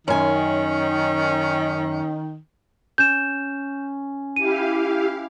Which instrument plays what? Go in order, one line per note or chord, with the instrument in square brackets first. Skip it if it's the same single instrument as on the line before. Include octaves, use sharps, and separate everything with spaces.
[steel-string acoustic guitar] F#2 G#5 [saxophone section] D#3 [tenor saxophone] C#4
[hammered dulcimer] C#4 [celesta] G6 E7
[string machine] E4 G4 F5 [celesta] D#7